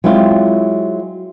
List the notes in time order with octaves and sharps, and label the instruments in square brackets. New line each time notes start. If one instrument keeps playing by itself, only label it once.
[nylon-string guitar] F#3 G#3 C4 E4 F4